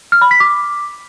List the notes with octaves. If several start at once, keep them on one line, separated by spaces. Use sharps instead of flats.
F6
B5
B6
D6